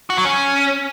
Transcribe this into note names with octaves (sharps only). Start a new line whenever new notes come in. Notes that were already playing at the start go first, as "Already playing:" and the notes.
F#4
F#3
C#4